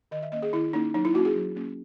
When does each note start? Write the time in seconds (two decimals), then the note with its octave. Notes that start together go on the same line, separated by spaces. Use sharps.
0.11 D#3 D#5
0.22 E5
0.32 A#3 C#4 D#5
0.42 G#4
0.53 D#3 E4
0.73 A#3 C#4 D#4
0.94 F#3 D#4
1.05 E4
1.14 A#3 C#4 F#4
1.25 G#4
1.36 F#3
1.56 A#3 C#4